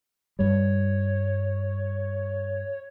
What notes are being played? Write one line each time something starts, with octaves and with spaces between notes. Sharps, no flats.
G2 G3 C#5